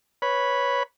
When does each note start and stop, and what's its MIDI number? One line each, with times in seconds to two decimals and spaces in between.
0.22 0.83 71
0.22 0.83 73
0.22 0.83 83